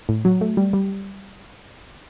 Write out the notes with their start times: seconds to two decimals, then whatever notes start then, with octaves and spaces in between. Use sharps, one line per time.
0.09 A2
0.25 F#3
0.41 A3
0.57 G3
0.73 G3